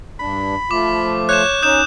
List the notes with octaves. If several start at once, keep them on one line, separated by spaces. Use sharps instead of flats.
G2 D4 B5
F3 A3 F4 D6
C#5 F#6 G6 E7
C#4 D#4 D#6 G6 E7